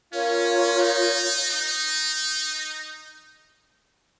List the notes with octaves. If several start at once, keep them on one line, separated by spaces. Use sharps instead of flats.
C#4 F4 A#4 C#5 F5
D#4
D#4